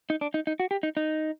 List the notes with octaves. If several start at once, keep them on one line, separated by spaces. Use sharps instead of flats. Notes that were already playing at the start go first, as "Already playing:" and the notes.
D#4
D4
D#4
D#4
F#4
G4
D#4
D#4